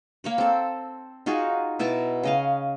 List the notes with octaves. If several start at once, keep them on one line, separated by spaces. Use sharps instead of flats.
A#3 C#5 B5
C4 A4
D#4 F4 F#4 G#4
B2 E4 A5 A#5
C#3 D#5 F5